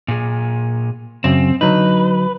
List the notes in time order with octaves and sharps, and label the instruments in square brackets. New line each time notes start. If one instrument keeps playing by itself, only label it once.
[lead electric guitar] A#2 G#4
[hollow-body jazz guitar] F#2 C#3 [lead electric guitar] C4
[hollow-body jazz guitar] D3 F#3 D#4 [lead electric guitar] B4